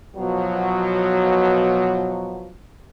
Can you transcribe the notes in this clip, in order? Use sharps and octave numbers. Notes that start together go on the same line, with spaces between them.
B2 F3 F#3